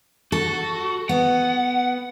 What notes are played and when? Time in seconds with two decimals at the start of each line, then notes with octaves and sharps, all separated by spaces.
0.32 F#4 A4
1.09 B3 F#5